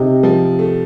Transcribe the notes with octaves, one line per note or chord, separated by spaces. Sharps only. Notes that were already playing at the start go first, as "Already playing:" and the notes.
Already playing: C3 D#4
F3
A3